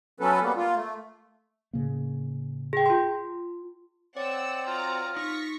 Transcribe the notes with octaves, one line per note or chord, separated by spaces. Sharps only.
F#3 B3 C#4 A4 B4
G3 A#3 B3
A#3 F4
A3
A2 C#3 A#3
G#4 G5
F4 C6
C4 C#5 D5 F#5 E6
F4 F#4 D5 A#5
D#4 C#6 A#6 B6